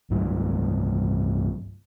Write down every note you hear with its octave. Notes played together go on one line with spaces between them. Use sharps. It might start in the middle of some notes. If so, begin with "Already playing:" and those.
C2 G2 F#3